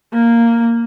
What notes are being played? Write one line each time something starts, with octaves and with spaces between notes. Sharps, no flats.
A#3